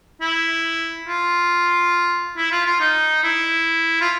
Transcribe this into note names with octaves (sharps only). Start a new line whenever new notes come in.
E4
F4
E4
F4
F4
D#4
E4
F4